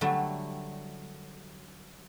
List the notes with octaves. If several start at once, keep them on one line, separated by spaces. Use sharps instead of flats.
D3 F#3 G3 A3